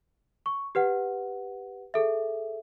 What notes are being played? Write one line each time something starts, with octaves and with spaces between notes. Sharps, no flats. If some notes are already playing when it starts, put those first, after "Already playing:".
C#6
G4 B4 F#5
G#4 A4 E5